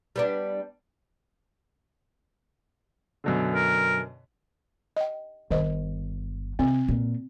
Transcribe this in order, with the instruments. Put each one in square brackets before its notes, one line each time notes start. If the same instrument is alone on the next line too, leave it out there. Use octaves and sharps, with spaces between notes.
[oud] G3 B3 D4
[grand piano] F#2 B2 D3
[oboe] A#4
[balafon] D#5 G5
[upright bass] G1 [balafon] D#3 C5 D#5
[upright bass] C3 [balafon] C4
[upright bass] A#2